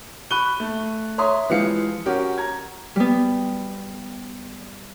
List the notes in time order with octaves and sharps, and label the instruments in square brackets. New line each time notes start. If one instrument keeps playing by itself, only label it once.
[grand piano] B5 C#6 F#6 D#7 G7
A3
C#5 E5 A#5 C6 D#6
E3 F3 G#3 G4 F5 C#7
C#4 F#4 G4 A#4
A#5 G#6
[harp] G3 B3